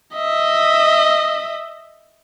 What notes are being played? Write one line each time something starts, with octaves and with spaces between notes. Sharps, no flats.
D#5 E5